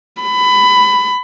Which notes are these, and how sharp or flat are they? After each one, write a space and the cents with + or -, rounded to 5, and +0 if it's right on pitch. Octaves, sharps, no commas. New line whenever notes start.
B5 +20